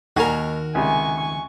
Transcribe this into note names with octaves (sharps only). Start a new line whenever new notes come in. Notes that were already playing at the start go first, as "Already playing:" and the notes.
D#2 D#3 F#4 A#4 G#5 A#5
C#2 C3 G#5 C#6